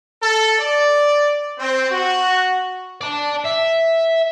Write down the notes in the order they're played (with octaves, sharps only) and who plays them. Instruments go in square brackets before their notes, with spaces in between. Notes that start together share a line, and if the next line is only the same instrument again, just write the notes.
[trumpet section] A4
D5
C4
F#4
[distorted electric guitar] D5 A5
E5